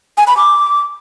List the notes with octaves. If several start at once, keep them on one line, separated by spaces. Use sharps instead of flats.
G#5
B5
D6